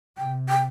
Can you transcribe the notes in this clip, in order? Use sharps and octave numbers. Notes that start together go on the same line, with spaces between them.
C3 G5
G5